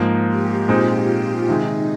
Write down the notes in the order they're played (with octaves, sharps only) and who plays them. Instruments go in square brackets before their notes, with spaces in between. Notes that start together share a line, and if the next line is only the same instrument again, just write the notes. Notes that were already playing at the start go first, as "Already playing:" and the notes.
Already playing: [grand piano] G#2 F3 A#3
[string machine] G4
[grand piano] A#2 G#3 C4 D#4 [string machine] F4
[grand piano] C3 D#3 G#3 [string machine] D#4